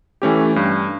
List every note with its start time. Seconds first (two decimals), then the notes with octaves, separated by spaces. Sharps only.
0.22 E3 A3 C#4 G4
0.56 G2